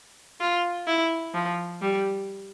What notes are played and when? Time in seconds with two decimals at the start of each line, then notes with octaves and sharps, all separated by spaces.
0.40 F4
0.87 E4
1.35 F3
1.81 G3